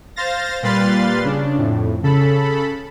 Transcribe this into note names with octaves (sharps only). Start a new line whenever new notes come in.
C5 F5 A6 A#6
A#2 G3 B4 F5 C6 A6
C#3 D4
F2 A2
C#3 A4 B5